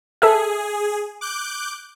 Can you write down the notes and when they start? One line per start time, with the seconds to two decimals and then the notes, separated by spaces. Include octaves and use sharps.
0.22 G#4 A4 E5
1.21 D6 F#6 G6